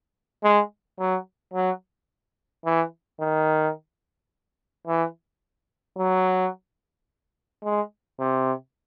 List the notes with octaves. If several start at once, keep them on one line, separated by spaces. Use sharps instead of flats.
G#3
F#3
F#3
E3
D#3
E3
F#3
G#3
C3